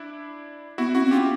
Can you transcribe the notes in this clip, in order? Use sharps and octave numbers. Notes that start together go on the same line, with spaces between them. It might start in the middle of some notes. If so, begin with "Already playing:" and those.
Already playing: D4 E4
B3 E4 F#4
C4 E4 F#4
C4
C#4 F4 G4